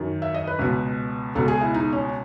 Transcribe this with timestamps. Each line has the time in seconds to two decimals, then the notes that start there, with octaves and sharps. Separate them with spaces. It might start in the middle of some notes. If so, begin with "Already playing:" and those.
Already playing: F#2 D#3
0.22 E5
0.34 D#5
0.47 B4
0.59 C#2 B2
1.35 C#2 B2 A4
1.48 G#4
1.61 E4
1.74 D#4
1.93 C#4